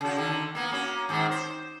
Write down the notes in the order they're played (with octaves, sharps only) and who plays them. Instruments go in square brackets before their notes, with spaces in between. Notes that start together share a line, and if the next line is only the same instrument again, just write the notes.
[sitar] C#3 F#4
D3 D#3
A#3 B3
A#3 C#4 F#4
G#2 D#3 C4
C5